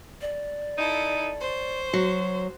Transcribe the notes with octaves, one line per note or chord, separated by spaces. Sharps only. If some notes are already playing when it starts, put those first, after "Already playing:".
D5
D#4 E4 A4
C5 C#5
F#3